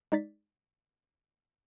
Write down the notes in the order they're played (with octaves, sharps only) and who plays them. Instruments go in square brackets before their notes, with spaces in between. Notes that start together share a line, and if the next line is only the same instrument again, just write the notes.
[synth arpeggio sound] G#3 D#4 D5 A6 B6